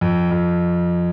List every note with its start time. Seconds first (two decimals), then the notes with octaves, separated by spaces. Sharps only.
0.01 F2
0.31 F2